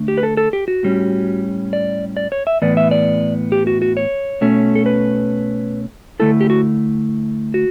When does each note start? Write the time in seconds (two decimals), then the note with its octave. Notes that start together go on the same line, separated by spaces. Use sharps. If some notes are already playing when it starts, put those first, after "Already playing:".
Already playing: D3 A3 D4
0.08 G4
0.18 B4
0.23 A4
0.37 A4
0.53 G4
0.68 F#4
0.83 A2 G3 C#4
1.73 D5
2.17 D5
2.32 C#5
2.47 E5
2.62 A2 E3 B3 D5
2.77 E5
2.91 D5
3.52 G4
3.67 F#4
3.82 F#4
3.97 C#5
4.41 B2 A3 C#4
4.75 A4
4.86 B4
6.20 D3 A3 E4 A4
6.41 G4
6.50 F#4
7.54 F#4